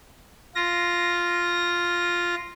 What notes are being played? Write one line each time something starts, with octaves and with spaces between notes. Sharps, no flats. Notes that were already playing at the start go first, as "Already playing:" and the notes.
F4 A#6